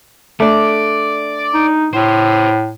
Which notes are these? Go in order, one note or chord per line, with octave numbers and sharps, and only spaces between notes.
A3 D4 D5
D#4
A2 C5 E5